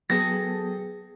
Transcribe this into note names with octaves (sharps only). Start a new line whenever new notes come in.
F#3 B3 G#4 A4 G5 A#6